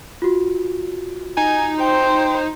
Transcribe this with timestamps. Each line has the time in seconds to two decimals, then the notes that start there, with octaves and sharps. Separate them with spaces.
0.22 F4 F#4
1.37 D#4 G#5
1.80 C5 G5